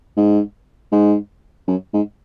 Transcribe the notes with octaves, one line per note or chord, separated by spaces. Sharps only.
G#2
G#2
F#2
G#2